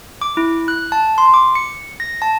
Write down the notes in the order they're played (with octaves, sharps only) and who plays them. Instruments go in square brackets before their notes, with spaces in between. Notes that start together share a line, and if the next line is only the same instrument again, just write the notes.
[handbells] D6
E4
F#6
A5
C6
D6
C#7
A#6
A5